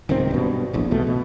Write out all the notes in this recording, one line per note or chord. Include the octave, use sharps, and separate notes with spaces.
D1 C#2 D#3 C4
G2 B2
F1 A#1 E2
B1 E2 B2 A3
B2